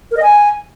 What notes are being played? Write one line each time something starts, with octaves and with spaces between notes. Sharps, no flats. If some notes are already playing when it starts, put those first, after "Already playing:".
A#4
D#5
G#5